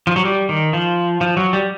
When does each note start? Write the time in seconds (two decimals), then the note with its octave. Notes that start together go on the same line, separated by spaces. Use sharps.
0.07 F3
0.16 F#3
0.25 G3
0.49 D#3
0.73 F3
1.21 F3
1.37 F#3
1.53 G3